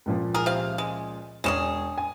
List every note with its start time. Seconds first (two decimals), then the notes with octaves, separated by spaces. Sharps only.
0.06 C#2 A#2 F3
0.34 G#4 A#4
0.46 C3 F5
0.78 G#3
1.44 E1 G#3 C#4 G#4 E7
1.98 G#5